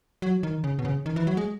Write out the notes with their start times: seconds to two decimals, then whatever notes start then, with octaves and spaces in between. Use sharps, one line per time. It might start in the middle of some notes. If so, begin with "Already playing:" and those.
0.22 F#3
0.43 D#3
0.64 C#3
0.79 B2
0.85 C#3
1.06 D#3
1.16 E3
1.27 F#3
1.37 G#3